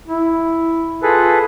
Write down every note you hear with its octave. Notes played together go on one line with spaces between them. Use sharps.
E4
F4 G#4 A4 B4